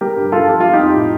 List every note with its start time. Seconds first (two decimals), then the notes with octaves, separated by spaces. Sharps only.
0.01 G3 G4 A#4
0.17 G2
0.32 G2 F4 A4
0.48 F3 G4
0.60 G3 F4
0.73 D#4 G4
0.79 F2
0.95 A2